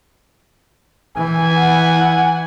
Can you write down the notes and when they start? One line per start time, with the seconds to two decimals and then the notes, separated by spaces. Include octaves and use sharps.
1.17 E3 G#5
1.56 E4 F#5